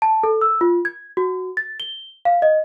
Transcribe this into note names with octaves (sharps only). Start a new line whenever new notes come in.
A5
A4
E6
F4
G#6
F#4
A6
G7
F5
D#5